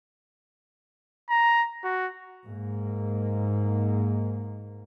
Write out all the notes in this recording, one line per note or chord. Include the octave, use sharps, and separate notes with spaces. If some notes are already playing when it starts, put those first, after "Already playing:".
A#5
F#4
G#2 A#3